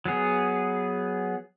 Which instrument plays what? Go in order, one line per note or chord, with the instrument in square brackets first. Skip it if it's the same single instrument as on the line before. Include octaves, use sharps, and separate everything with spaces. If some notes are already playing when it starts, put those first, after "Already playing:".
[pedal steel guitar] F#3 B3 G#4